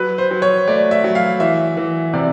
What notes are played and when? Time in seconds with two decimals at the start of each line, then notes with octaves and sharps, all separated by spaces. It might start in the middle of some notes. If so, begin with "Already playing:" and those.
Already playing: F#3 B4
0.18 C5
0.31 F#3
0.42 C#5
0.68 A3 D5
0.91 E5
1.04 F#3
1.15 F5
1.40 E3 E5
1.77 E3
2.13 C3 D5